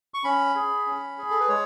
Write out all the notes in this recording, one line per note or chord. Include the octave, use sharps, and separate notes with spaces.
C#6
C#4 B5
G#4
C#4
G#4
A4
B4
G#3 C#5